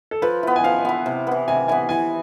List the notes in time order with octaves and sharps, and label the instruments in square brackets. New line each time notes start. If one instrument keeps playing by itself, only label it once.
[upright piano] A4
[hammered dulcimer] F3 [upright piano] B4
[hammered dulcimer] B3 E4
[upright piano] G#5
[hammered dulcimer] F3 [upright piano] F5
[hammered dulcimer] B3 E4
C3
E3 B3
[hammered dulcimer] C3 [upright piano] G#5
[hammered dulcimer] E3 B3 [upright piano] G#5
[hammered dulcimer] E3 [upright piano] G#5